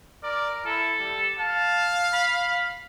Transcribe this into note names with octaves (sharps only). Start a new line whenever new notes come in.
A#4 D5
E4 A4
G3
F5 A5
B5